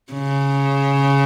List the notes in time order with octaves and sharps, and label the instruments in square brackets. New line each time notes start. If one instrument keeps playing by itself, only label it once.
[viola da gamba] C#3